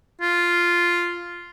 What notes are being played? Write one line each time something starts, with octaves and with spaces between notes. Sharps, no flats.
F4